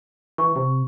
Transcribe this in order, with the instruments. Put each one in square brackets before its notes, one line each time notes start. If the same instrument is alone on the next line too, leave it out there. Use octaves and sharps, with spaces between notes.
[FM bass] E3 [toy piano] C#6
[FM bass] C3